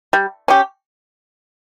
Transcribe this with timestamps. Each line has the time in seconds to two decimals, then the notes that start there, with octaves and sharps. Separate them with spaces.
0.13 G3
0.48 C#4 G4